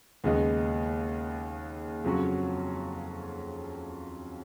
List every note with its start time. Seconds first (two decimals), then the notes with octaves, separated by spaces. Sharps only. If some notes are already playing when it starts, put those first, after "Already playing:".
0.24 D#2 C#3 G#3 B3 D#4
2.04 F2 C#3 F#3 C#4 F#4